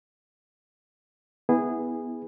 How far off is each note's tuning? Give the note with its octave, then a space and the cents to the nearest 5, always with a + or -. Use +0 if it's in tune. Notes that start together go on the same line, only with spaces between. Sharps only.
B3 +0 E4 -20 G#4 -20